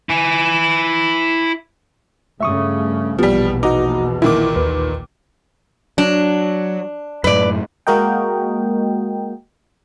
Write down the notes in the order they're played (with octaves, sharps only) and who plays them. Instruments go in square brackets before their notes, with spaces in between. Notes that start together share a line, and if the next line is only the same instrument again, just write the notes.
[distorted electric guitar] E4 G#5
[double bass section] G2 C#3 A3 [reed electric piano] E5 C#6 D#6
[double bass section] A#1 E2 B2 [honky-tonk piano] F3 G3 [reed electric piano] B3 G4
[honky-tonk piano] D#4 [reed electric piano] F#4 D6
[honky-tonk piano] A#2 D#3 D6 [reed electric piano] E4
[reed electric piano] D#2 B4
[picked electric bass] F#3 [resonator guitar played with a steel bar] D4
[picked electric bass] F#2 A2 [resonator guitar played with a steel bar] B4 D5
[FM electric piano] G#3 A#3 F#4 A#4 D#5 G5